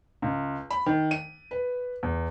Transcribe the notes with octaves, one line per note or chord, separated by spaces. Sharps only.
C#2
B5
D#3
D#7
B4
E2